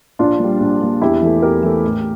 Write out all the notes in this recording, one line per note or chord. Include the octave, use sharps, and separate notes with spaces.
A#1 D4 F4
A#2 G3
A#1
A#2 G3
E2 E4 G4
E3 A3
E2 G4 A#4
E3 A3
A1